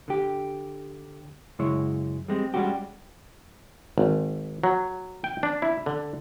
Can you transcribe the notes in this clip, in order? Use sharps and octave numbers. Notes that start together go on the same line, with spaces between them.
D3 G4
F#2 C#3 G#3 E4 C#5
G3 G#3 C4
G3 G#3 C#4 F#4 G4
G#1
F#3
G5
D4
E4
D3